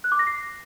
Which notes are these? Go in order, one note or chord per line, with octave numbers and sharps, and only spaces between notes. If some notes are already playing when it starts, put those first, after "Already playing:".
F#6
D6
A#6
C7